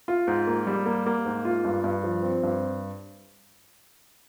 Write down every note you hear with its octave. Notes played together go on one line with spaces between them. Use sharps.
F4
G#2
A#3
G3
A#3
A#3
G#2
F4
G2
G2
F3
C4
G2